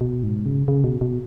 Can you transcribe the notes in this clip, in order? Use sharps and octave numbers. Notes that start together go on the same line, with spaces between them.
B2
G#2
C#3
C#3
B2
B2